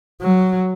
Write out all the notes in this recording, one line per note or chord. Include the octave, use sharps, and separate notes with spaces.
F#3